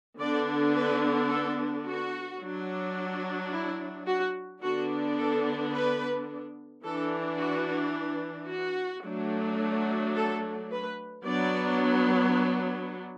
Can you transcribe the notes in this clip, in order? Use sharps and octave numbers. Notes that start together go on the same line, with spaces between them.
D3 B3 D4 D5
B4
A4
F#4
F#3 D4
E4
F#4
D3 B3 D4 F#4
A4
B4
E3 D4 A4
F#4
F#4
F#3 A3 D4
A4
B4
F#3 B3 D4 D5